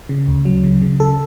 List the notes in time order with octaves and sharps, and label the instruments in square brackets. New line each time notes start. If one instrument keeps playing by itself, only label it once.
[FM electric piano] C#3
D2
F#3
C#3
C#3
C#3 A4